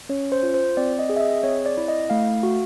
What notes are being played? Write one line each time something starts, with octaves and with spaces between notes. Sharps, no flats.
C#4 C#5
C5
F4
C5
C4 D5
D#5
G#4
E5
D#5
C4 C#5
D5
E4
D#5
A3 F5
F#4